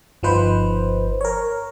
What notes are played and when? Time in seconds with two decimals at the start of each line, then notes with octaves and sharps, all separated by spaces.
0.23 G1 F3 D#4 B4 C5
1.21 A#4 C#5